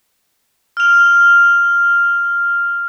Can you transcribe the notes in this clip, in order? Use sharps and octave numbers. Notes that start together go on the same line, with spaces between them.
F6 F7